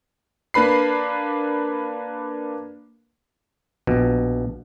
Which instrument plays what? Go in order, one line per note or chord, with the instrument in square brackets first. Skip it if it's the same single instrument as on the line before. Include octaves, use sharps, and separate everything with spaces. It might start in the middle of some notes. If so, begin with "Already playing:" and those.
[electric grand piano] A#3 D4 B4 B5 C7
[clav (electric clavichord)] A#1 B2